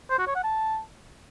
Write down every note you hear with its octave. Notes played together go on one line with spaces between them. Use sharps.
C5
F#4
C#5
F#5
A5